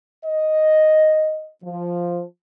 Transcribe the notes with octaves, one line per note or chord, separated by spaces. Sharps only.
D#5
F3